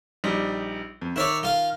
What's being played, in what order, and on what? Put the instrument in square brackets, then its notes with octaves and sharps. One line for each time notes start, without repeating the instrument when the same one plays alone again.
[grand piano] A#1 G3 D#4
F2
[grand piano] D#3 [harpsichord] E4 C#5 D5
[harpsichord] F4 F5